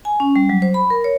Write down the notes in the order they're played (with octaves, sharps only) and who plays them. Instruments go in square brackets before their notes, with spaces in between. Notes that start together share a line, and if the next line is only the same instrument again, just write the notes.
[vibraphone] G#5
C#4
G3
F#3
C5
B5
A#4
C#5